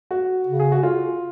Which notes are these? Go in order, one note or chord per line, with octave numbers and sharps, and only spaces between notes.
F#4
C#3
G#4
F#4
F4